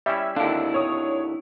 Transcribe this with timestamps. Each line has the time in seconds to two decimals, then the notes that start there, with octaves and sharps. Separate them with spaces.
0.06 G3 C#4 E4 E5
0.36 D#2 D3 D4 E4 F5 A5
0.74 C#5 D#6